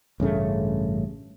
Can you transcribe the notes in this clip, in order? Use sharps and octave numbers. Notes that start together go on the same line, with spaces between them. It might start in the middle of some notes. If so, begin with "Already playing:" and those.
A1 G2 C#3 A3